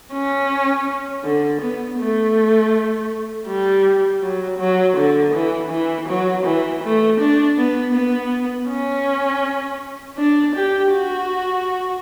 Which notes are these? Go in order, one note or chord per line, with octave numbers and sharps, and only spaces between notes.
C#4
D3
B3
A3
G3
F#3
F#3
D3
E3
E3
F#3
E3
A3
D4
B3
B3
C#4
D4
G4
F#4